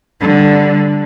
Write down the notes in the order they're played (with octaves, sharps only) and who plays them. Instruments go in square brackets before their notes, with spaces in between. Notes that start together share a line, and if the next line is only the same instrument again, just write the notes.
[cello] D3 G3